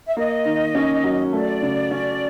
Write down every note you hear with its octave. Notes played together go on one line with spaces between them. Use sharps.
E5
A#3 D#5
D#3
C#4
F#3
A3 D5
C#3
C#4